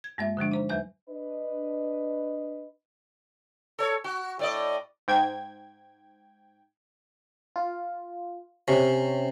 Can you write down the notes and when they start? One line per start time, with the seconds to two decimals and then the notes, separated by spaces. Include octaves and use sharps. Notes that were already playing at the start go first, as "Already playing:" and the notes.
0.04 G#6
0.18 G2 G#3 A#3 E5
0.37 D3 F3 G#3 D4
0.51 D#4 C5
0.69 E2 F#3 B4 E5 G#5
1.09 D4 B4 D#5
3.79 A4 C#5
4.04 F#4
4.39 A2 D5 D#5
5.08 G#2 G5 G#6
7.56 F4
8.68 C3 C#4